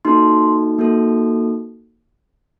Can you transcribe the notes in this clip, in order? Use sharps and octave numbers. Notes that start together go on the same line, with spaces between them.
A#3 D#4 F#4 A4 C6
A#3 D#4 F#4 A4